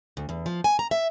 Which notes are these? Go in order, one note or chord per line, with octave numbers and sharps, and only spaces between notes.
D2
E2
F3
G#5
A#5
E5